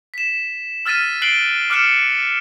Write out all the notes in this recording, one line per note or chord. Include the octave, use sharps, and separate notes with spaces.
B6 E7
E6 F6 A6 B6 D#7
F#6 C7 D7 F#7 G7
D6 F6 F#6 C#7 E7